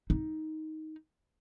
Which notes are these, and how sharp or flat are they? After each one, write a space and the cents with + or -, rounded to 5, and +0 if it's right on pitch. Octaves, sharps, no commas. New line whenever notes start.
D#4 +10